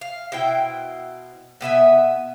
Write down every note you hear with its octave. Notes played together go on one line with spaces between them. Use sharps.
F5
B2 E4 C5 G5
B2 B3 E5 G#5